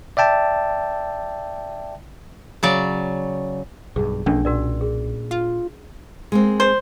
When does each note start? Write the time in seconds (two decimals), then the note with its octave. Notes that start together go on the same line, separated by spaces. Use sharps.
0.17 D5 E5 G5 A5
2.63 C#3 F#3 D5
3.96 B1 G2 G#4
4.26 B1 F3 A3 A#3 C#4 D4
4.45 A#2 F#4 A#4 D5
4.81 G#4
5.31 F4
6.32 G#3 A#3 C4
6.60 C5